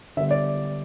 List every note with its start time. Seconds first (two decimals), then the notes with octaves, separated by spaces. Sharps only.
0.17 D3 G3 B3 E5
0.31 D5